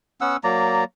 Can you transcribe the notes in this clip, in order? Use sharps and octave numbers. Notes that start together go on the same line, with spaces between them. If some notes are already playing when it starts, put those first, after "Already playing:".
B3 C#4 F#5 E6
F#3 A#3 D5 A#5